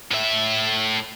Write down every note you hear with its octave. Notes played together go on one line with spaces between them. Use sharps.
A2 E5